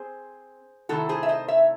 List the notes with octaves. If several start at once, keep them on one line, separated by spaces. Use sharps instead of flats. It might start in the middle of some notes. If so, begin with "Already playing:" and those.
Already playing: C4 G#4 C5
C3 D#3 A3 C4 E4 F#4 A4
G#4 C5
E5
C5 D#5
C#5 E5